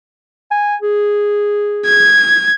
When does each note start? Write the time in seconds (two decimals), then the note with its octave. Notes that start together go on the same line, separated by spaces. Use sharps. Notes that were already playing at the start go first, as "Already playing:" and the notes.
0.51 G#5
0.82 G#4
1.86 G#6